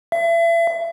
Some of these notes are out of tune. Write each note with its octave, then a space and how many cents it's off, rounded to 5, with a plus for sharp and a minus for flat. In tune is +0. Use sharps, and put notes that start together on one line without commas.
E5 +35